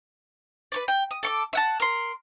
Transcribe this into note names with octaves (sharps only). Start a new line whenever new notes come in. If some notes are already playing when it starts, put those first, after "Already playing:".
B4 C#5 D5
G5
D#6
A4 C#6 D6
E5 F#5 A5
A#4 C6